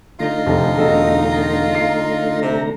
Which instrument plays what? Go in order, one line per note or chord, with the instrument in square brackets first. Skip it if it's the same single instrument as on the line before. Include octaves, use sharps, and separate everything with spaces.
[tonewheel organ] D3 A3 A#5 [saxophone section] D#4 F4
[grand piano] F1 A5
E1 A4 D#5
C7
[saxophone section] C3